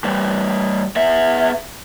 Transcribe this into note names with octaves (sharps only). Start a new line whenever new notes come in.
E3 G3
B3 E5